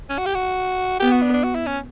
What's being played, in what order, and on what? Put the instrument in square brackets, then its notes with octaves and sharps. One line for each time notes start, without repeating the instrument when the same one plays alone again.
[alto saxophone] C#4
F#4
G4
F#4
[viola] B3 [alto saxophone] G4
[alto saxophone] F#4
D4
D4
F#4
E4
C#4